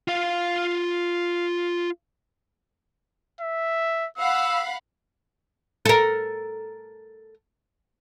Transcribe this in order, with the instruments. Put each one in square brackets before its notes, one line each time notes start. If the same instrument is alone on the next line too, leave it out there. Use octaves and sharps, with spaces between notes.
[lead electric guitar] F4 F5
[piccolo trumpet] E5
[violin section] F5 F#5 B5 [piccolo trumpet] E6
[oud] A4 A#4